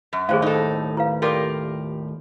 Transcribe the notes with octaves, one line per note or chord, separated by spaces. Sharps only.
F#2
D#2 A2 G#4 C5 F5
D#4 A4
E4 B4 F5
F4 G4 A4 A#4 D5 D#6